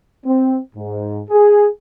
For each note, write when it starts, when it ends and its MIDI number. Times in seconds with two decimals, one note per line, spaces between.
0.25 0.58 60
0.76 1.20 44
1.30 1.66 68